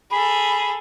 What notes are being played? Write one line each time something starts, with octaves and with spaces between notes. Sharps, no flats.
G#4 A4 B5